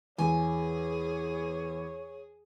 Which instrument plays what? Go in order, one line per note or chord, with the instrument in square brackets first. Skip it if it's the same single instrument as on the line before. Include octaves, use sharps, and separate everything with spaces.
[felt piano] E2 [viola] G#4 [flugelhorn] C#5 [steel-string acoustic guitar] G#5